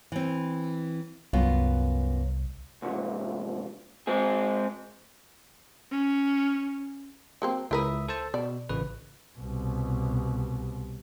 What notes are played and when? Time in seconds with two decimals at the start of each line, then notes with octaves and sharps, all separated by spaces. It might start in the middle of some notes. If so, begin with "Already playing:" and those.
0.12 E3 C4
1.33 C2 F#2 B3 F4
2.82 C2 G#2
4.07 G#3 C4 G#4
5.92 C#4
7.42 F#3 A#3 C4
7.71 C#2 E4 A#4 B4 E5 D#6
8.08 A4 C5 A5
8.34 B2 D5
8.69 A1 C#3 B4
9.38 C2 B2